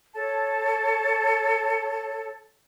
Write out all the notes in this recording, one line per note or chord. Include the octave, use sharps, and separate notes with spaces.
A4 C#5 A5